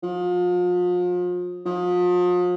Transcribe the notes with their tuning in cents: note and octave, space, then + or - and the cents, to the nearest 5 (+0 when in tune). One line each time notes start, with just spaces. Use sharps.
F3 +35
F3 +40